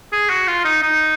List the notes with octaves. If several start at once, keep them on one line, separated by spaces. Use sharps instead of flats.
G#4
F#4
F4
D#4
D#4